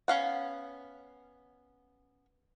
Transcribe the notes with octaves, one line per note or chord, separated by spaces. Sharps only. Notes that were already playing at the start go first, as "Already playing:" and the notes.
B3 C#4 F5 F#5